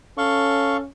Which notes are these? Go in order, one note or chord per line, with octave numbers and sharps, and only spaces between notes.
C#4 A4 F5 C#6